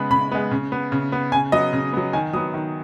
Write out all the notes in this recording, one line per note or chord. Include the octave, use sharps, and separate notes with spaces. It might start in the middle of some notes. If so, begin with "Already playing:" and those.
Already playing: C#3 G#3 B3 B5
C#3 B5
G#3 B3
C#3
B3
C#3
B3
C#3 G#5
F#3 B3 D#5
C#3
F#3 B3
D#3 G#5
F#3 B3 D#6
D#3